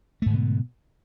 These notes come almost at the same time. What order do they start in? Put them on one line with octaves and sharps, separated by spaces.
A3 G#2 D3 B2